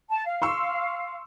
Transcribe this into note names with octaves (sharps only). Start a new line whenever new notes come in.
A5
F5
C6 C#6 E6